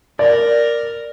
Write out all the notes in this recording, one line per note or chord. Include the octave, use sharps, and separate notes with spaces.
A#4 D5